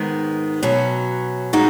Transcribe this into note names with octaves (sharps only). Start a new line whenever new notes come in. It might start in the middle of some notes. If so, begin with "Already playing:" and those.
Already playing: G#2 D#3 G#3 B3
B2 F#3 C#4 F#4
A#2 G#3 D#4 F#4